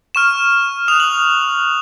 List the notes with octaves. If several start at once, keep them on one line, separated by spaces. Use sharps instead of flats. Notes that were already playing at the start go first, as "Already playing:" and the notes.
C#6 F6 E7
D#6 F#6 F7
F#7